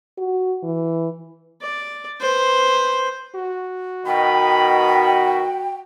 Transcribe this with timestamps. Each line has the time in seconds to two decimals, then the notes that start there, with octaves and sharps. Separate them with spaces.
0.18 F#4
0.63 E3
1.62 D5
2.20 B4 C5
3.35 F#4
4.06 B2 D#3 G5 B5